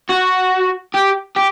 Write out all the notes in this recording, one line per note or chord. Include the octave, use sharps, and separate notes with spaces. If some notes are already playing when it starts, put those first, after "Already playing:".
F#4
G4
G4